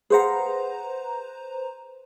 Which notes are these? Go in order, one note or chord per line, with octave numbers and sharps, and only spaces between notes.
G#4 B4 C5 F5 F#5 A#5